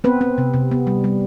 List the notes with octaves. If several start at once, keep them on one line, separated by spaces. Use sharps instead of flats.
B3 C4 B4
C4
C3
C3
B3
G3
G3